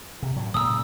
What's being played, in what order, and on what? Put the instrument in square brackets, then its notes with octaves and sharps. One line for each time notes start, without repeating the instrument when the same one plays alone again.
[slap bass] C3
A2 F#3
[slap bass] A#2 C#3 G#3 [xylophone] D#6 E6